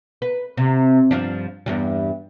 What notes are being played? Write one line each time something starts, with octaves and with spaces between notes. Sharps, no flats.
B4
C3
G2 F3 D4
E2 G2 G3